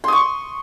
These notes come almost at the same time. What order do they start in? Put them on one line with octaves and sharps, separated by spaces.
C6 D#6 C#6